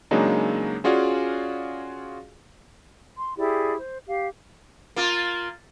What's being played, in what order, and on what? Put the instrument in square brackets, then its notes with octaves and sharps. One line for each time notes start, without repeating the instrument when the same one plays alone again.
[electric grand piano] C#3 F#3 G#3 A#3 D4 D#4
C#4 F4 F#4 G#4 D5 F5
[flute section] C6
E4 G4 G#4 D5
C5
G4 F5
[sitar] A#3 F4